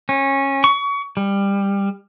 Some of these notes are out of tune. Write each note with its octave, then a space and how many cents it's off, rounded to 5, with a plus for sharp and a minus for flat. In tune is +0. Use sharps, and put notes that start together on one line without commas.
C#4 -20
C#6 +30
G3 +20